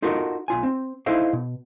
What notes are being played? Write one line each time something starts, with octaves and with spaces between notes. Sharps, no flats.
D#4 F4 F#4 A4 A#4 D#5
B1 F4 G#5
C4
D#4 E4 A4 C5 D#5 F5
B2